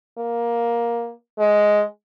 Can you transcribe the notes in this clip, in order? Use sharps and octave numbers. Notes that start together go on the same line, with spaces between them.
A#3
G#3